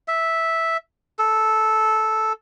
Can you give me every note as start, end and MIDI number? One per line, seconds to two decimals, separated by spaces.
0.08 0.77 76
1.19 2.33 69